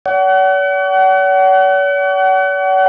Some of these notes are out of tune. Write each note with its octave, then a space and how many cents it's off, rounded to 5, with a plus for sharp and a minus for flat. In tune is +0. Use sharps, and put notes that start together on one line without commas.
C#5 +45 F#5 +35